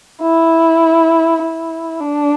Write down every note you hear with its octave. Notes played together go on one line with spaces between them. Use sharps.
E4
E4
D4